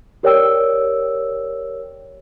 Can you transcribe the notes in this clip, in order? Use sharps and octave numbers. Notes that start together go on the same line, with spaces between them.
G4 A#4 C#5 D5 G5 E6